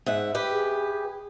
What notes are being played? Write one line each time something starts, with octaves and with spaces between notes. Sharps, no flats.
G#2 E5 F#5
G4 B4
G#4